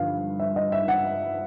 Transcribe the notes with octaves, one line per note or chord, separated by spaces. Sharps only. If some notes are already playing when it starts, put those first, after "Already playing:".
Already playing: G2 D3 F3 F5
E5
D#5
E5
F#5